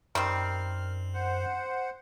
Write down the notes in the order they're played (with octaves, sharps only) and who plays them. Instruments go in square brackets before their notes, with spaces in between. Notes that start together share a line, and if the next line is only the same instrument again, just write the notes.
[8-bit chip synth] F#2 [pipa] D#3 G3 C4 [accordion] F6
[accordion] C5 F#5